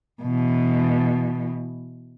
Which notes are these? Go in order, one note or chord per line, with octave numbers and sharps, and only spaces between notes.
B2 E3